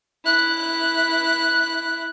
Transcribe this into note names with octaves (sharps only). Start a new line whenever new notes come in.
E4 F#6